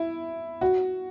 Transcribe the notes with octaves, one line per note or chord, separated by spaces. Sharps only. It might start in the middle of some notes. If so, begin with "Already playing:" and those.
Already playing: E4
F#4